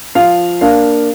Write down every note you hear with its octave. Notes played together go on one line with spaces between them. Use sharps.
F3 F5
A#3 D4 F5